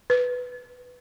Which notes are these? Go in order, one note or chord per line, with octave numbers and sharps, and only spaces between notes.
B4